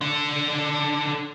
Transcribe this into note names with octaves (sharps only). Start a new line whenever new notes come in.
D3 D4